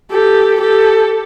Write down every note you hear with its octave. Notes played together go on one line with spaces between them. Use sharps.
G4 A4
G4 A4